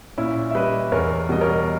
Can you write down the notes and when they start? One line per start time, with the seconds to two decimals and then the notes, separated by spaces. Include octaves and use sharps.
0.18 A#2 C#4 E4
0.51 E5
0.55 G3 B4 D#5
0.92 E2 A#4 C#5
1.29 B2 G3 D#5
1.41 A#4 C#5